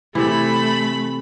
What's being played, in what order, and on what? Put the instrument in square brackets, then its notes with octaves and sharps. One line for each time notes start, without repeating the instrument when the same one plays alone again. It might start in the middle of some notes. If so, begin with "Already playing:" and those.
[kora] C3 E3 [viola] A3 B5